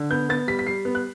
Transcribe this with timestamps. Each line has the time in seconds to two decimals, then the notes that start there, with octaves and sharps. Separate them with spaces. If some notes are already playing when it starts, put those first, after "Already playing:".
Already playing: D3
0.11 B3 G6
0.29 B3 A6
0.48 G3 B6
0.59 B6
0.67 G3 C7
0.85 B3
0.95 F#6